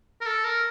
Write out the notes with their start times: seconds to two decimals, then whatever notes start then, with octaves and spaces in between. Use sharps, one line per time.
0.21 A#4
0.26 A4
0.44 A#4